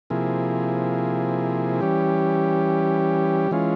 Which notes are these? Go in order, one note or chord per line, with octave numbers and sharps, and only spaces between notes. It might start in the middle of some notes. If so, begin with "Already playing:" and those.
C3 F3 A#3 E4 G#4
E3 G3 C#4 G4
E3 G#3 C#4 F4